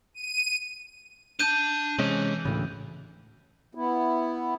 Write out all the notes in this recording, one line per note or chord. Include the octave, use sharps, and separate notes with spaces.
D#7
D4 A5 G6 D#7
C3 E3 G#3 C#4
D2 A2 C#3
B3 E4